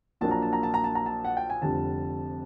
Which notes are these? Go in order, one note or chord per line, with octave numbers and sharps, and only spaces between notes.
A#1 A#2 F#3 A#3 D4 A5
A#5
A5
A#5
A5
A#5
A5
A#5
A5
F#5
G5
G#5
F1 F2 D3 G3 A5